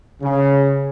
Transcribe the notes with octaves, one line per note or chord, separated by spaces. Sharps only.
C#3